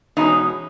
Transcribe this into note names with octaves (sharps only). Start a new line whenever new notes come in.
E2 B2 G#3 C#4 D#4